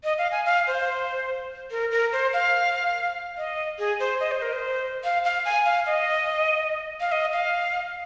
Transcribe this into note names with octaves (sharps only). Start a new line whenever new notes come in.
D#5
F5
G#5
F5
C5
A#4
A#4
C5
F5
D#5
G#4
C5
D#5
C5
A#4
C5
F5
F5
G#5
F5
D#5
F5
D#5
F5